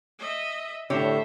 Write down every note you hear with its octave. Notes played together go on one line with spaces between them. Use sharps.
D#5 E5
A2 D3 G4 C5 C#5 E5